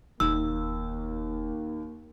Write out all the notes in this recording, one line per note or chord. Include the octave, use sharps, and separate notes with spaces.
E1 D#2 A#3 E6